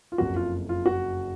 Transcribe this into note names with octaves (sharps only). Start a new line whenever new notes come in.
F4
F#1 F2 C#3 F#4
F4
F4
F#4